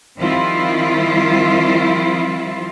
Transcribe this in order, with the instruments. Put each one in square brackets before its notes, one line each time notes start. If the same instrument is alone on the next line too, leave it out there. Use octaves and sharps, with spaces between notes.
[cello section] D#3 F3 G3 C4 E4 F4